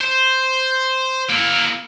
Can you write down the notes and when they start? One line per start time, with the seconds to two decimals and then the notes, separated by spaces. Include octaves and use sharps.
0.01 C5
1.29 A#3 E4